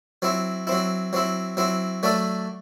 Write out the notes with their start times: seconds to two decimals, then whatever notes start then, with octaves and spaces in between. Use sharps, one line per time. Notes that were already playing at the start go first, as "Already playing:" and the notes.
0.22 F#3 C4 E4
0.67 F#3 C4 E4
1.13 F#3 C4 E4
1.57 F#3 C4 E4
2.03 F#3 A3 D4 A4